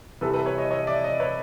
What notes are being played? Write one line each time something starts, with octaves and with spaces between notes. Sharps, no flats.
C2 C3 E3 A4 B4
A4 B4
B4 C#5
C#5 D#5
C#5 D#5
D5 E5
C#5 D#5
B4 C#5